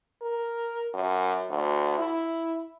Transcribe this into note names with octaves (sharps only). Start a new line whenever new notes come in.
A#4
F#2
D2
E4